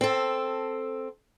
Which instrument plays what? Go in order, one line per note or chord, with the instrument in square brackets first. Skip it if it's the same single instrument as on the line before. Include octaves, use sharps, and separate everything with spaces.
[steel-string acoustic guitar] C4 A4